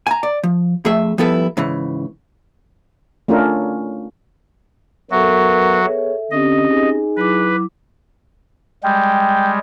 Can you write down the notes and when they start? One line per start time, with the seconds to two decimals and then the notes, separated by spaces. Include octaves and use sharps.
0.07 G#5 A#5
0.23 D5
0.43 F3
0.85 F2 A3 G#4 E5
1.18 F3 G3 B3 E4 A4 B4
1.57 G#2 C#3 E3
3.28 A3 C#4 D4 F4 A#4
5.11 F#3 B3 F#4 A4 A#4 E5
5.82 B3 G#4 C#5
6.31 D3 C4 C#4 G4 D#5
6.70 D#4 G#4
7.17 F#3 E4 B4 D6
8.83 G3 G#3 G5